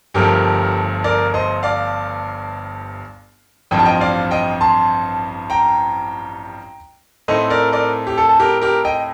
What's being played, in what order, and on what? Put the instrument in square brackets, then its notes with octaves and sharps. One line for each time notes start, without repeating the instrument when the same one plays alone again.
[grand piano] G1 G2 F3 A3 G4 A#4
A#4 D5
C5 D#5
D5 F5
A1 G2 F3 C4 G5
A5
D#5 G5
D5 F5
D#5 G5
A5 C6
G5 A#5
A2 A3 C4 D#4 C5 D#5
A#4 D5
A#4 D5
G4
A4
A4
G4 A#4
G4 A#4
D#5 G5